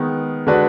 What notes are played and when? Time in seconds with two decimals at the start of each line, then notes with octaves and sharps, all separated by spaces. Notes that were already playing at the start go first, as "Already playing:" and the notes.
Already playing: D#3 G#3 B3
0.47 D3 G#3 D4 F#4 B4